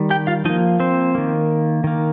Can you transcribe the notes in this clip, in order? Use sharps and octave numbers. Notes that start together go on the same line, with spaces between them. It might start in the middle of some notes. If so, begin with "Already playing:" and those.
Already playing: D#3 G3
G4 G5
F4 F5
F3 A#3 D#4 D#5
C4 C5
D#3 A#3
D#3 A#3